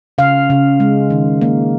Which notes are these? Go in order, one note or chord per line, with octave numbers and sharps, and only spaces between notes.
C#3 F5
C#3
G#3
D#3
A#3